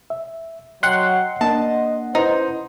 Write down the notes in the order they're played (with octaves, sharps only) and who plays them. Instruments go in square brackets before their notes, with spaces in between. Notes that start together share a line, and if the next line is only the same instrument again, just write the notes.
[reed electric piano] E5
[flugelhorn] F#3 [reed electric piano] D#5 G5 F#6 [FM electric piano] F#5 C6
[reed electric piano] A#3 D4 [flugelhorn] D#5 [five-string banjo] A5
[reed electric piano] C#4 E4 B4 [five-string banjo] D#4 [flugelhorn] C5